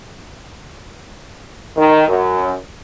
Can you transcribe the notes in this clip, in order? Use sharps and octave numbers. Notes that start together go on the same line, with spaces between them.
D#3
F#2